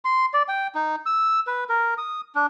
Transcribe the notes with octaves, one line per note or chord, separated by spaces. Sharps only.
C6
D5
G5
D#4
E6
B4
A#4
D#6
D4